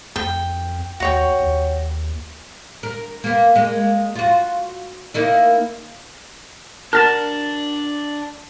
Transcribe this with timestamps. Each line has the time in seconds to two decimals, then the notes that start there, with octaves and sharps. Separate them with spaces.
0.16 F2 G5
1.00 D#2 F#4 C#5 G5
1.40 D#2
2.83 A#4
3.24 A#3 B3
3.55 G#3 A#3
4.15 F4 F#4
5.14 A#3 D#4 E4
6.93 D4 F#4 A#4 A5 F6 A6 E7